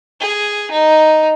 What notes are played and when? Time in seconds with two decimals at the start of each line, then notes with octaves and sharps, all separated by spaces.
0.20 G#4
0.71 D#4